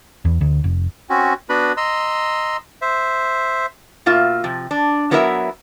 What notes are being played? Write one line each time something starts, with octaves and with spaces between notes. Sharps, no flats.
E2
D2
F1
C4 C#4 F#4
B3 D4 F#4 B4 B5
D#5 A#5 C6 E6
C5 E5
B2 A#3 F4 E5
C3 F3
D4
F#3 B3 E4 A#4 D5 E5